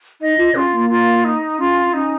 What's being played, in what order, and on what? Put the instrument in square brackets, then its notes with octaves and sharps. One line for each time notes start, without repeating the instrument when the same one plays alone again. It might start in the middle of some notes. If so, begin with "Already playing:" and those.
[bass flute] D#4 [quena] D#5
[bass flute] F4
[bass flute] C#4 [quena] F4
[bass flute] A#3
[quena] F4
D#4
[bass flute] C#4 [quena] F4
[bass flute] C#4 [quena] D#4